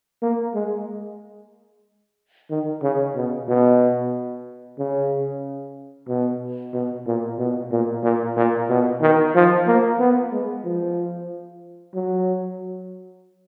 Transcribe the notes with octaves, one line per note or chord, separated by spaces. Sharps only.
A#3
G#3
D#3
C#3
B2
B2
C#3
B2
B2
A#2
B2
A#2
A#2
A#2
B2
D#3
F3
A#3
B3
G#3
F3
F#3